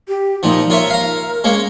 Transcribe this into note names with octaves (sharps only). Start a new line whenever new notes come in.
G4
A#2 F3 D#4
F4 A#4 C#5 E5
F5 A#5
G#3 A#3 C#4